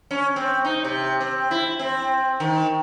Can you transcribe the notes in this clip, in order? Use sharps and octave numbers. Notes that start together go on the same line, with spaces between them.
C#4
C4
D#4
C3
C4
E4
C4
D#3